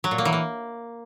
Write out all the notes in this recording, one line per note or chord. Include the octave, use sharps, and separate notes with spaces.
F#3
A#2
A#3
E3
A#3